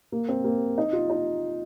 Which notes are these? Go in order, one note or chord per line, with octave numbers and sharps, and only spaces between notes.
A#3
C4
A#3
D#4
F4
D#4